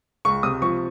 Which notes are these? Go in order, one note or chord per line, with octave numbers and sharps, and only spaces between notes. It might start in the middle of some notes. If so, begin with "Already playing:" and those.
C#2 C#6
C3 D#6
F3 C#6